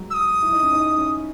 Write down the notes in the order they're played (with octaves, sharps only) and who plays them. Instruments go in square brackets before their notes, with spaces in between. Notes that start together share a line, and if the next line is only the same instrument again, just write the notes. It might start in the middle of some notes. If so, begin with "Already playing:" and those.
Already playing: [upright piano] F#3 G#3
[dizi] E6
D#6
[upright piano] E4
D#4
C#4
D#4
D#4
C#4